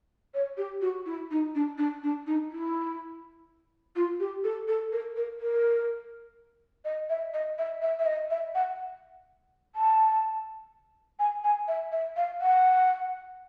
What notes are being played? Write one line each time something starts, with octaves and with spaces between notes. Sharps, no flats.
C#5
G4
F#4
E4
D#4
D4
D4
D4
D#4
E4
F4
G4
A4
A4
A#4
A#4
A#4
D#5
E5
D#5
E5
E5
E5
D#5
E5
F#5
A5
G#5
G#5
E5
E5
F5
F#5